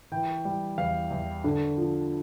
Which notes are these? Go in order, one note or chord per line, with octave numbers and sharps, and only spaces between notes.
E3 G5
G3
E2 F5
E2
D3
F3